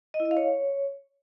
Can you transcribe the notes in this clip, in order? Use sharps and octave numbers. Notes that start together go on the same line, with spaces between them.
D#5
E4
D#5
F5
C#5